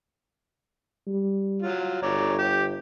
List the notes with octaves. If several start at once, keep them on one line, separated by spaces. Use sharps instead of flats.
G3
F#3 F4
G1 C#5 D5 A#5
G4